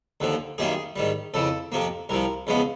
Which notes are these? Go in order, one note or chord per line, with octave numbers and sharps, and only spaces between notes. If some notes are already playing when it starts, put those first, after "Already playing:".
D#2 D3 F3
F#2 D#3 G3 A#3 G#4
G#2 D#3 G3
F2 C#3 E3 A4
F2 C3 F3 A#3
C2 C3 F3 A#4
E2 C#3 F3 G#3 B3